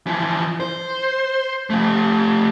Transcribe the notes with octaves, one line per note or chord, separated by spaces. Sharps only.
E3 F3
C5
F3 A3